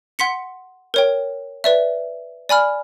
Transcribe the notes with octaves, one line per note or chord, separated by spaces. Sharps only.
F#5 C6 B6 C#7
A#4 C#5 G5
B4 D5 E5
D5 G#5 B5 F6